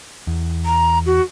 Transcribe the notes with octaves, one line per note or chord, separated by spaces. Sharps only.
E2
A#5
F#4